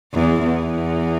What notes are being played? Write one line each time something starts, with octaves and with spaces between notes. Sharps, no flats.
E2
E2